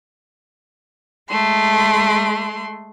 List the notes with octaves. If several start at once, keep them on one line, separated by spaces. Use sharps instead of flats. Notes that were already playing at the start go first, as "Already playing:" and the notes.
G#3 A3 C6